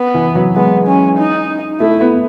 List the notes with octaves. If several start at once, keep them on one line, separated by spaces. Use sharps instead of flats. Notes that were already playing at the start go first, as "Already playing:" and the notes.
Already playing: B3
E3
F#3
G#3 B3
C#4
D#4
A3 E4
B3